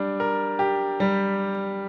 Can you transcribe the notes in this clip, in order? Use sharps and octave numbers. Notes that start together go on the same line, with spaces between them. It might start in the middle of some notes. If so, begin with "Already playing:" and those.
Already playing: G3 D4
A#4
G4
G3